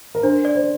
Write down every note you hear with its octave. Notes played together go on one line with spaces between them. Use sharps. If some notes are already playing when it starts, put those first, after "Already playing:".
A#4
D4 C5
D5
C5